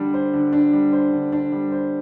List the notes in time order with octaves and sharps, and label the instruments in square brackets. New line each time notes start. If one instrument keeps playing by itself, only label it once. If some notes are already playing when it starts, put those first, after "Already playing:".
Already playing: [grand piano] D3 G3 D4
C5
D3
D4
G3
C5
D3
D4
G3
C5